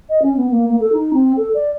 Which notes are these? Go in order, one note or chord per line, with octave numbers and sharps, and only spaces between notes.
D#5
C#4
B3
A#3
A#3
A4
D#4
C4
A4
D5